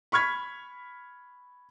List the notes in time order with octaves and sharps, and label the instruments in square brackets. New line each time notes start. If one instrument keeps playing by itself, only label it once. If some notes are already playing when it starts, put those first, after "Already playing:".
[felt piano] B5 C#6 F6 G#6 B6